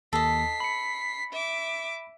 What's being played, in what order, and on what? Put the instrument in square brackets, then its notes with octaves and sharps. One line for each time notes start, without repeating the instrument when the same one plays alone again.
[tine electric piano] D#2 [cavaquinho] A4 D#5 [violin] B6 C7
[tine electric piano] B5 C#7
[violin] E5 D6